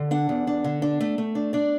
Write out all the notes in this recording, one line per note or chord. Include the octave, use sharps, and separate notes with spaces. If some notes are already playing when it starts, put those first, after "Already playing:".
Already playing: D3
D4 F#5
E2
D4
D3
D4
A3
A3
D4
D4 D5